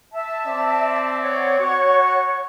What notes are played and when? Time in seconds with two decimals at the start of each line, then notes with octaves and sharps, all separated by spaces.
0.12 E5 A5
0.47 C4 D5
1.22 C#5 F#5
1.60 F#4 C#6